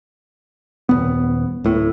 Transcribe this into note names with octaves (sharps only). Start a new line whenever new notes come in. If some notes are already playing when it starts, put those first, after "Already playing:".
D#1 B3
D1 A2